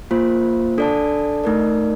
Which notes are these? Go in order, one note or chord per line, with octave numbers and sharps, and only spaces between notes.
A#3 F4 C5
D4 A4 D5 A5
A3 D#4 A#4 D5